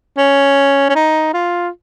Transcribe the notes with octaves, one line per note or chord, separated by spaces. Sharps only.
C#4
C#4
D#4
F4